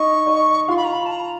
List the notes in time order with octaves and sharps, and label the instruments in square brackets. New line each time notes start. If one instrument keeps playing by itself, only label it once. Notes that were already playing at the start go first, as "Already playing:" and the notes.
Already playing: [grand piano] D#4 D#5 [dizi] C#6
[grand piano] D#4 D#5
[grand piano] F4 F5 [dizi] C6
[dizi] B5
A#5
B5
A5
A#5